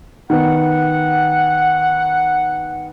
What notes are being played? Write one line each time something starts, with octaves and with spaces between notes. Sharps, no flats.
D#3 B3 F#5